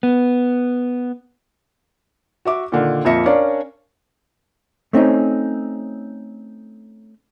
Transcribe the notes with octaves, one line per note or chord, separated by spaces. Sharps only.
B3
F#4 E5 D6
A#2 D3 D#3
F2 A#2 E5 A#6 C#7
C#4 D4 A#4 D5 F5
A3 C4 C#4 D#4